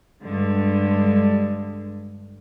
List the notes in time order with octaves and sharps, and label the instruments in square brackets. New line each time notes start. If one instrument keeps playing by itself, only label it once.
[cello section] G2 D3 G#3